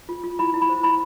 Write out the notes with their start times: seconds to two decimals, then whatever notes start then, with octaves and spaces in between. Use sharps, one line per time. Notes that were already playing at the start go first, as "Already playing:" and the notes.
0.09 F4
0.24 F4
0.39 E4 B5
0.54 E4
0.62 B5
0.69 C5
0.83 E4 B5